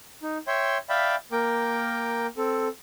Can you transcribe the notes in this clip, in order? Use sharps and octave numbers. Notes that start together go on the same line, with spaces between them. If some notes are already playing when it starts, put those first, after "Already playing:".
D#4
C#5 E5 G5 C6
D5 E5 F5 G5 B5
A#3 A#4 G5 D6
C4 A4